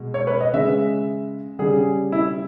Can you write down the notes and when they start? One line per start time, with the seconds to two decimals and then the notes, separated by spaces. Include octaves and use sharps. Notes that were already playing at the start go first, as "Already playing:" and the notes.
Already playing: B2 G#3
0.14 C#5
0.27 B4
0.41 D#5
0.53 C#3 G#3 E5
1.59 C#3 G3 G#4
2.12 E4